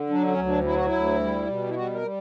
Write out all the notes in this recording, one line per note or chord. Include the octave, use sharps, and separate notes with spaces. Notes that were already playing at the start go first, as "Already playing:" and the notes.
Already playing: D3
F#3 D4
C#4
D2
D4
F#3 E4
F#4
E4
D2
G3
B2
E4
G3 F#4
A#4
G3